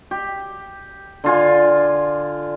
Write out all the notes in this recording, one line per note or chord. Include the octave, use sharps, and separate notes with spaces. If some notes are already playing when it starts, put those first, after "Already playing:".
G4
D3 F4 G#5